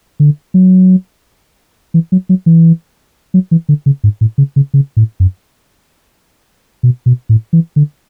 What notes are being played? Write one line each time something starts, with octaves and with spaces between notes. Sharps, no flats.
D3
F#3
E3
F#3
F#3
E3
F#3
E3
D3
C#3
G#2
A2
C#3
C#3
C#3
A2
F#2
B2
B2
A2
E3
D3